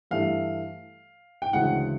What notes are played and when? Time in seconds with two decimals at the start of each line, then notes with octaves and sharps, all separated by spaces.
0.11 G2 E3 A3 F5
1.42 G5
1.53 D2 C#3 E3 G#3 F#5